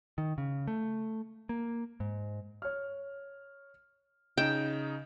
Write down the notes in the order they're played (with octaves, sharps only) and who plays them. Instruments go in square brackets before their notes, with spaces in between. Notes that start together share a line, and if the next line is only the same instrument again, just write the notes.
[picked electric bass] D#3
C#3
A3
A#3
G#2
[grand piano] C#5 F6
[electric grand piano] C#3 D#4 [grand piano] D#5 E7 [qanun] G5